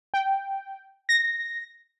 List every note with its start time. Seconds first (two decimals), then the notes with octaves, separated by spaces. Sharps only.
0.14 G5
1.09 A#6